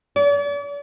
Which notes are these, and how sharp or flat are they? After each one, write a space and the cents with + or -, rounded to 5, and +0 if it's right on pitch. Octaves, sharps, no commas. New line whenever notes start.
D5 -45